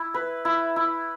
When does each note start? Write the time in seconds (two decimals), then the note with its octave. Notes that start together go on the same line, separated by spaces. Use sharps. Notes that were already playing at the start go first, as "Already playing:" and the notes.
Already playing: E4
0.14 B4
0.45 E4
0.76 E4